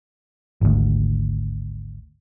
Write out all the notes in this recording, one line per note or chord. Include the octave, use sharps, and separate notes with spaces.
G#1 D2